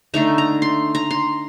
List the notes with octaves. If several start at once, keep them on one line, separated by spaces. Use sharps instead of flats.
D3 A3 D#4 A#5
A#5
C6
A#5
C6